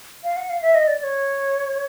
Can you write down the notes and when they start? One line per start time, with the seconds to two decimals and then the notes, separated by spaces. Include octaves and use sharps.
0.24 F5
0.37 F#5
0.50 F5
0.62 E5
0.74 D#5
0.88 D5
0.99 D5
1.04 C#5